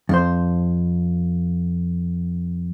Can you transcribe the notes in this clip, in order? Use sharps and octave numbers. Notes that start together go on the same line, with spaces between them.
F2 C5